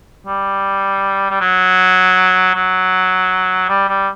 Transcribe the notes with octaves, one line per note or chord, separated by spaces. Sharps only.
G3
G3
F#3
F#3
G3
G3